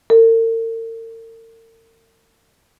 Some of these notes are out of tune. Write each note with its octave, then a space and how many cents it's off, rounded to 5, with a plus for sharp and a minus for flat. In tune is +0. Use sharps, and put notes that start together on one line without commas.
A#4 -45